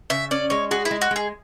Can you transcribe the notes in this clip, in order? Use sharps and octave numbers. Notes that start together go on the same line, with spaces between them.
C#3 E5
C#4 D5
G#3 C#5
F#4 G#4
E4
G#3
F#4
G#3
G#4